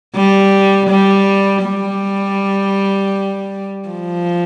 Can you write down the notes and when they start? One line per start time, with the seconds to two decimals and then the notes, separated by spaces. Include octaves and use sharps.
0.16 G3
0.90 G3
1.65 G3
3.89 F3